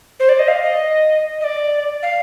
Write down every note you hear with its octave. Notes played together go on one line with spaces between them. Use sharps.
C5
D5
D#5
F5
D#5
D#5
D5
F5